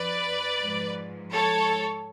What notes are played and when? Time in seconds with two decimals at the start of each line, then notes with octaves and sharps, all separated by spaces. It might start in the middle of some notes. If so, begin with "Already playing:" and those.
Already playing: F2 F3 B4 D5
0.61 G#2 F3
1.33 A4 C#5